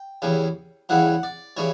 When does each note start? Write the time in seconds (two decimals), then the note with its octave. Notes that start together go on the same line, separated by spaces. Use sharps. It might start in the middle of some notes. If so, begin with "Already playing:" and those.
Already playing: G5
0.22 E2 C#3 E3 G3
0.89 E2 C#3 E3 G3 F#5
1.23 D5
1.57 C#3 E3 G3 C#5